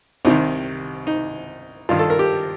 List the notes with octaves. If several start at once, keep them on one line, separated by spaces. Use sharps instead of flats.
C2 C3 D#3 D#4
D#4
G2 D#3 F4
A4
A#4
G4